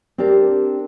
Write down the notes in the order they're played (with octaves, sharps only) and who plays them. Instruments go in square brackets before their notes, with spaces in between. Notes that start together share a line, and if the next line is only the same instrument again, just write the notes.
[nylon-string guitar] C4 D4 G4 A#4 D5